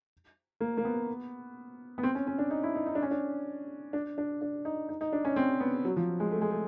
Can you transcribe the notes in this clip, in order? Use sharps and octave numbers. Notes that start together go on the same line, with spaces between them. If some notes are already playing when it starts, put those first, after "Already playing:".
A#3
A#3
B3
B3
C4
C#4
C#4
D4
D#4
E4
D#4
D#4
D4
C#4
D4
D4
D4
D4
D#4
D#4
D#4
D4
C#4
C4
B3
F#3
F3
G#3
A3
G#3
A3